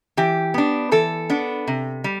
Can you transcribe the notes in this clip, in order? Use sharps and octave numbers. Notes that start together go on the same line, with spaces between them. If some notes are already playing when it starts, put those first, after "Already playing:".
E3 G4
B3 D4
E3 A4
B3 D4
C3
G3